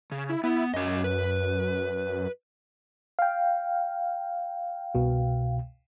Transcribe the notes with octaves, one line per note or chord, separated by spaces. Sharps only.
C#3
E4
B3 E4
F#2 C#4 D#5
B4
F5 G5
C2 B2